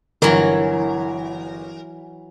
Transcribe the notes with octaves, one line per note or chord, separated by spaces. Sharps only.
G1 E3 F#3 A#4